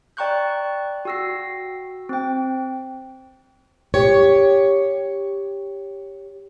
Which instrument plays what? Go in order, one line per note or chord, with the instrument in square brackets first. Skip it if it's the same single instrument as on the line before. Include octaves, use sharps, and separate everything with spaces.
[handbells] D5 G5 A#5 C#6 F#6 G6
F#4 G5 E6 A#6 C7
C4 G5
[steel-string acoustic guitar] G4 C#5